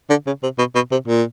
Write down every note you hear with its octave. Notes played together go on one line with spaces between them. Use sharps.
D3
C#3
C3
B2
B2
C3
A#2